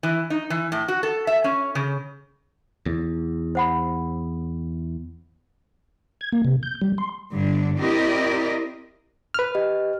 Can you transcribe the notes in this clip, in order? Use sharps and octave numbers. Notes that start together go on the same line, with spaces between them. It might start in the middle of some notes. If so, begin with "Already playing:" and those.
E3
D#4
E3
A2
F#4
A4
E5
C#4
C#3
E2
C5 F#5 B5
G#6
A#3
C3
G6
G3
C6
G2 D3 D4
C4 E4 G4 A#4 D5 D#5
B4 F6
G4 D#5